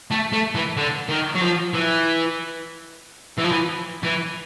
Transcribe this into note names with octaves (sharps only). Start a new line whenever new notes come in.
A3
A3
E3
D3
D#3
F#3
F3
E3
E3
F3
E3
E3